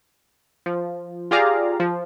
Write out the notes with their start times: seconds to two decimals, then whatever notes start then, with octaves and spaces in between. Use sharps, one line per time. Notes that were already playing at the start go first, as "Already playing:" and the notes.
0.66 F3
1.31 F4 G4 G#4 D5 F5 A#5
1.80 F3